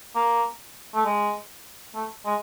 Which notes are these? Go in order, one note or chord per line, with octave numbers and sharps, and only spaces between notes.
A#3
A3
G#3
A3
G#3